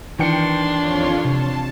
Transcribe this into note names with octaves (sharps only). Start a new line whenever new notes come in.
D#3 E3 D4 G5 C6 C#7
F2 F4 C#5
C3 A5